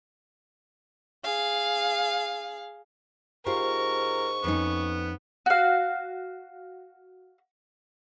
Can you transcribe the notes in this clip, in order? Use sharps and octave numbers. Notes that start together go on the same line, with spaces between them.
G#4 F5
G#2 F4 G4 A#4 C5 C#6
F2 B3 C#4 D#4
F#4 F5